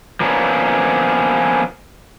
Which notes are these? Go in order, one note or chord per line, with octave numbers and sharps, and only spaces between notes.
F3 A#3 B3 C#4 D4